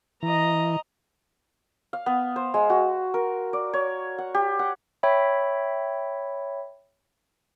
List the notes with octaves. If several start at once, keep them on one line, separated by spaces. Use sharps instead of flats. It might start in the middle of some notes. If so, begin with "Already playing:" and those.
E3 D#5 A#5
F5
B3
C5
G#3
F#4
A#4
D5
C#5
F#5
G4
F#5
C#5 E5 G5 B5